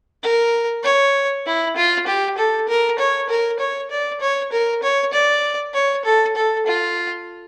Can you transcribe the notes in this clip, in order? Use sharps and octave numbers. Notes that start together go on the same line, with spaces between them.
A#4
C#5
E4
F4
G4
A4
A#4
C#5
A#4
C#5
D5
C#5
A#4
C#5
D5
C#5
A4
A4
F4